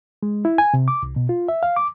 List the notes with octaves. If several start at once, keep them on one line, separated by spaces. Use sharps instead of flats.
G#3
E4
G#5
C3
D6
C2
B2
F4
E5
F5
D6